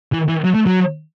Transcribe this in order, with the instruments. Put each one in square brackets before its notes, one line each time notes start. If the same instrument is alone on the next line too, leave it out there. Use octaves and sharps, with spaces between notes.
[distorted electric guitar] E3
E3
F#3
A3
F#3